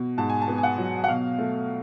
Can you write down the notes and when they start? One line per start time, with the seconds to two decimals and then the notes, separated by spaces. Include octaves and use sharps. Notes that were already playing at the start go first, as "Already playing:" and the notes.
Already playing: B2
0.18 G#2 A5
0.30 G#5
0.42 A5
0.48 B3
0.58 G#5
0.63 F#5
0.78 F#3
1.04 F#5
1.08 B2 F5
1.38 A3